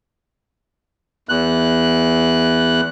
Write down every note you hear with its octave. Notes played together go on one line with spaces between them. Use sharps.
E2 F#6